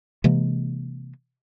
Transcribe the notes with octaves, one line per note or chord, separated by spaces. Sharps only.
C3 E3 G#3 A#3